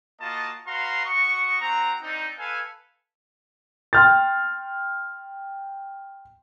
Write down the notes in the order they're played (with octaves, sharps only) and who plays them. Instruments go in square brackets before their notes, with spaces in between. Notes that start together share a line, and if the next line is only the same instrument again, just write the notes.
[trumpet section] A#3 F4 F#4 D#5 A5
F#4 B4 F5 A#5 C6
F#4 D#5 C#6
C4 F#4 A#5
C4 D4 D#4
A4 B4 F5 G#5
[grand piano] G5 C6 F6 G6 A6